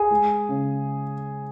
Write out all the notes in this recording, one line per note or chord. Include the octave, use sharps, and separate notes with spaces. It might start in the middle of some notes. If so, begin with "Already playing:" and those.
Already playing: G#4 G#5
G#3
C#3